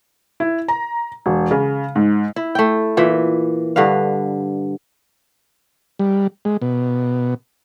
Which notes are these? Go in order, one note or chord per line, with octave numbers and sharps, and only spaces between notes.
E4
A#5
E1
C#3
G#2
E4
A3 G5
A#2 E3 E5
G2 D3 B4 F5
G3
G#3
B2